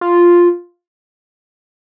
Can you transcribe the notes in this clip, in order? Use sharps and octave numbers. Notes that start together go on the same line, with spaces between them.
F4